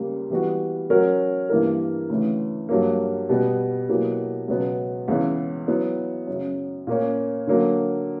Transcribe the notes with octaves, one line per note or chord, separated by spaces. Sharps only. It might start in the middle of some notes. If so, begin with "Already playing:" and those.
Already playing: C#2 C#3 G3 A#3
E3 G3 B3 F#4
F#3 C#4 F#4 A#4
G2 E3 A#3 E4 A#4
D2 C#3 E3
G2 F#3 A#3
B2 G3 B3
B2 F#3 A#3 E4 G4
C#2 B2 F#3 B3
C#2 C#3 E3 B3 E4
F#3 B3 E4
F#2 C#3 F#3
A#2 A#3 C#4
D3 F#3 A#3